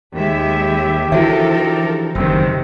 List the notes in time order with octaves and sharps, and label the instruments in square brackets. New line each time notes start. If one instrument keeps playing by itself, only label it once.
[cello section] D#2 G#3 E5 [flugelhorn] G4
[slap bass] D3 E3 [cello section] F3 A4 A#4 [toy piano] E4 F#4 E5
[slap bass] F#1 E2 [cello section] C3 D#3 [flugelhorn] C4